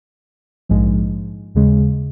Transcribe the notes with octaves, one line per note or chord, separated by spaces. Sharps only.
A#1 G#2 F3 G#3
D#2 C#3 G#3